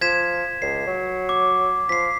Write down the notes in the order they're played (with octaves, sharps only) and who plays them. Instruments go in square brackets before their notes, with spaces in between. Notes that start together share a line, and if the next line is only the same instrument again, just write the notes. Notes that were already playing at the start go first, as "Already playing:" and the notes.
[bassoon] F3 [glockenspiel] G#6 B6 E7
[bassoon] C#2 [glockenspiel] C7
[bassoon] F#3
[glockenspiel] D6
[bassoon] F3 [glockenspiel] B6 C7